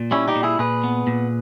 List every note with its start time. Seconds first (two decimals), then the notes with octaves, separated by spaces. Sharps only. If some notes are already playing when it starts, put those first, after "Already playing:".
Already playing: A#2
0.11 G3 C#4 E4
0.28 D#4 G4
0.36 A#2
0.43 E4 G#4
0.59 A#2 G#4 B4
0.84 B3
1.07 A#2